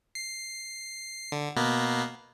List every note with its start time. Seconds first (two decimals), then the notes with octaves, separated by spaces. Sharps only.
0.15 C7
1.32 D3
1.56 B2 A#3 B3